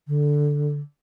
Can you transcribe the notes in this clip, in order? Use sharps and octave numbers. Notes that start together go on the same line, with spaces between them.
D3